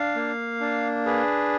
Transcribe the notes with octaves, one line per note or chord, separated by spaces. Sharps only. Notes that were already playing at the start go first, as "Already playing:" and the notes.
Already playing: D4 F5
A#3
D4
G#4 B4